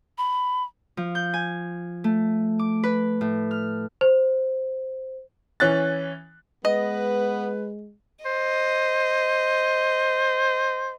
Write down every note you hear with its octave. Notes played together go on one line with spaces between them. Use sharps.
B5
F3
G6
G#5
A3
D6
B4
A2
F6
C5
E3 C#4 F#6 A6
G#3 B3 B4 D#5
C5 D#5